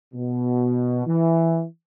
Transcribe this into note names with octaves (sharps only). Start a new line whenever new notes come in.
B2
E3